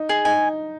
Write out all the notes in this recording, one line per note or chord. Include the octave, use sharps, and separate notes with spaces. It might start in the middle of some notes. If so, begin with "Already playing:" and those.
Already playing: D#4
G#4
D#4 G#5